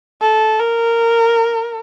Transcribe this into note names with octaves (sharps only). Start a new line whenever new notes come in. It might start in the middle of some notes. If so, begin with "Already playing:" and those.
A4
A#4